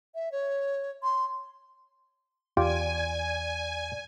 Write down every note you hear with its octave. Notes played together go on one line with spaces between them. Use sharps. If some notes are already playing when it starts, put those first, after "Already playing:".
E5
C#5
C6
E2 F4 G4 D5 G#5